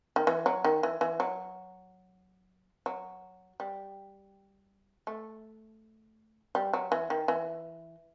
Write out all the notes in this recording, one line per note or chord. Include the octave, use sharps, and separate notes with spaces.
D#3
E3
F#3
D#3
E3
E3
F#3
F#3
G3
A3
G3
F#3
E3
D#3
E3